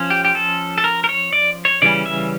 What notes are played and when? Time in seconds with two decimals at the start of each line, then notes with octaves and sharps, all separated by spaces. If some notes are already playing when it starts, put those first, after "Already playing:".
Already playing: F3 C#4
0.10 G4
0.25 G4
0.35 A4
0.78 A4
0.84 A#4
1.04 A#4
1.09 C#5
1.33 D5
1.65 C#5
1.82 C#3 E3 G3 C#4 D5
2.06 E5